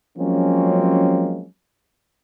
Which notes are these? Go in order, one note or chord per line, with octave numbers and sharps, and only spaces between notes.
F3 F#3 G#3 A#3 C4 C#4